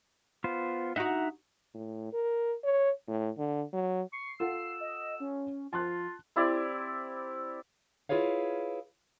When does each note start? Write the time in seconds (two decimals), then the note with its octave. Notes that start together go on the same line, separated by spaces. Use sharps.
0.44 B3 F4 C5
0.96 D#4 F#4 E5 F#5 A#5
1.74 A2
2.13 A#4
2.64 C#5
3.08 A2
3.38 D3
3.73 F#3
4.13 C#6 C7
4.40 F4 A4 F#5 E6
4.80 D#5
5.20 C#4
5.73 F3 F4 A5 C6 F#6
6.36 C4 E4 G4 D5
8.09 E4 F4 G#4 B4 C#5 F5